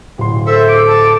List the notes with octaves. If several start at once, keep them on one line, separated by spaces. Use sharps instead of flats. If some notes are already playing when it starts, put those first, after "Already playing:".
D1 C6
A4 C5 E5
D6
A5